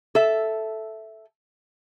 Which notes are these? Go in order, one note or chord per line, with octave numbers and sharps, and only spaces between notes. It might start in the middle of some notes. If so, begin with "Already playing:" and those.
A4 E5